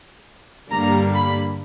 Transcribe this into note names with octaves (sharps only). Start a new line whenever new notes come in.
G2 D3 G3 A#3 A#5
B5